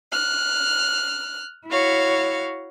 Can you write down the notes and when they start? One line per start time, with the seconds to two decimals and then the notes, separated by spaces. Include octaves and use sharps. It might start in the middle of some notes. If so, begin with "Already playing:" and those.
0.12 F6 F#6
1.67 E4 F#4 C#5 F5